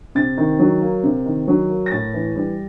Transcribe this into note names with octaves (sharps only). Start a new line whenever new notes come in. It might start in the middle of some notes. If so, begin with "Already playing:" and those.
C3 A6
D#3
F#3
A#3
C3
D#3
F#3
A#3
A#6
A2 A6
E3
G3